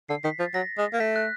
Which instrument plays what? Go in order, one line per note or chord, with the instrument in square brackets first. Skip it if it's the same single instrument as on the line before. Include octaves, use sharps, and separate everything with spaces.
[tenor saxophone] D3 [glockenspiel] C7
[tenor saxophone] D#3 [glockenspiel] B6
[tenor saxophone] F3 [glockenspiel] A6
[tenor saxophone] F#3 [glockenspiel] A#6
[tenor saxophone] G#3
A#3
[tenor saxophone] A3 [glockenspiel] B6
[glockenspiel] F#6